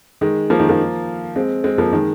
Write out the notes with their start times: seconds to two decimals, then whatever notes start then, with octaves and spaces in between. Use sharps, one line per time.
0.21 D#3 G#3
0.50 F3 A#3
0.59 D#3 G#3
0.69 F3 A#3
1.36 G#3 C4
1.64 G#3 C4
1.78 F3 A#3
1.93 D#3 G#3